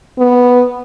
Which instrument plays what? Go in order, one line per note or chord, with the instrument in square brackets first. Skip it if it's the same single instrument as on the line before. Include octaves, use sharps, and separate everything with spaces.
[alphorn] B3